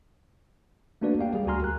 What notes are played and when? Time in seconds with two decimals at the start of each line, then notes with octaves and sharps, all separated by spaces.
1.01 A3 A#3 D4 F#4 B4 D5
1.19 A#3 G4 F5 G5
1.34 G3 G#4
1.47 D2 F#4 G#5 A#5 C6 F6
1.62 A#4 F#6